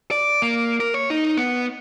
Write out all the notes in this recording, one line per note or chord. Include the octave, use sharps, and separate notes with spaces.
D5
A#3
A#4
C#5
D#4
B3